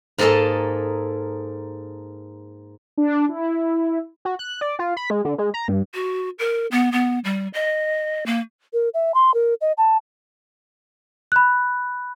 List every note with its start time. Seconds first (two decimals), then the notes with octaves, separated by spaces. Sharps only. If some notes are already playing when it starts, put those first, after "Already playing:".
0.18 G#2 A#3 G#4 A4 D#5 A5
2.98 D4
3.29 E4
4.25 F#4
4.39 F#6
4.61 D5
4.79 F4
4.97 B5
5.10 G#3
5.25 D3
5.38 G#3
5.54 A#5
5.68 G2
5.94 F#4
6.39 A#4
6.71 B3
6.92 B3
7.25 G3
7.54 D#5
8.26 A#3
8.73 A#4
8.94 E5
9.14 C6
9.34 A#4
9.61 D#5
9.78 A5
11.32 B5 F#6